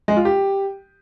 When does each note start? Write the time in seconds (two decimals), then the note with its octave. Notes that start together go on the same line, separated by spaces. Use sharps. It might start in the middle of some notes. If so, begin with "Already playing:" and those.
0.08 G#3
0.17 F4
0.25 G4